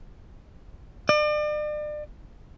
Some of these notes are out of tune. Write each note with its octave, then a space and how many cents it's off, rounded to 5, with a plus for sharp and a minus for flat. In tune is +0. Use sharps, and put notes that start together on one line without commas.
D5 +40